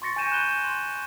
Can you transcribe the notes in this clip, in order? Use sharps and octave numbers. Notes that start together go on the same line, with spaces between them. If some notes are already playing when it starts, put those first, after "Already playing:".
C6 C#6 A6 A#6 C#7
G#5 C#6 G6 D#7 E7
B5 F#6 G6 G7
C6